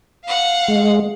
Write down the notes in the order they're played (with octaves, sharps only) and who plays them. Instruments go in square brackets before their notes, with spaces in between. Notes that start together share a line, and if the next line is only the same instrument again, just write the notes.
[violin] F5 F#5
[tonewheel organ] G#3